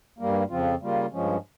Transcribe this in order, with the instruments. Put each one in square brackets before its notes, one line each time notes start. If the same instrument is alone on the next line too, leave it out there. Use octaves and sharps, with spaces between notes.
[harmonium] G2 G3 A#3
F2 C#3 F3 C4 F4
C#3 G3 A#3 F4
G2 F3 G#3 C#4